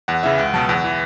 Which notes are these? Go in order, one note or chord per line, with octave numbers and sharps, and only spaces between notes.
E2 F#5
C#3 E3 E5
C#2 F#5
B2 F#3 A5
E2 F#5
E3